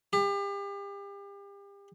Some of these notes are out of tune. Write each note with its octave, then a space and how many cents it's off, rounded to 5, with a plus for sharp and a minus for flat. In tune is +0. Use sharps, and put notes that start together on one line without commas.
G4 +35